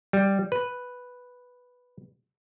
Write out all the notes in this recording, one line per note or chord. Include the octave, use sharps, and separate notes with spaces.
G3
B4